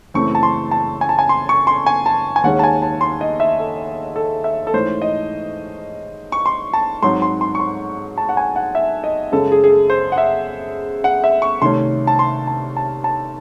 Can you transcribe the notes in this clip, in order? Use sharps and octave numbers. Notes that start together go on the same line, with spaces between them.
F#1 F#2 E3 A3 C4 C#6
A5
C6
A5
G#5
A5
G#5
C6
C#6
C6
G#5
A5
G#5
D#2 D#3 G#3 C#4 F#5
A5
G#5
A5
C6
D#5
E5
A4
A4
E5
A4
G#2 E3 A3 C#4 C5
D#5
C#6
C6
A5
G#2 F#3 C4 C6
C6
C6
C#6
C6
A5
F#5
G#5
F#5
E5
D#5
F#2 C#3 G#3 A4
G#4
G#4
A4
C5
F#5
E5
F#5
E5
C#6
C2 C3 D#3 A3 C#4 C6
A5
C6
A5
A5
A5